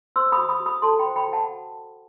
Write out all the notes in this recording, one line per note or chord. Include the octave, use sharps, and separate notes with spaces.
C5 C6 E6
B5 D#6
F#4
B5 D#6
F#4
B5 D#6
A4 A5 C6
G5 B5
C5
G5 B5
F#4 F#5 A5